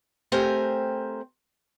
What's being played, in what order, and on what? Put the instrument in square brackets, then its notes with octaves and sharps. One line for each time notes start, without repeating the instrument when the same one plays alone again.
[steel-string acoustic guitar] A3 C4 G4 A#4 C5 G#5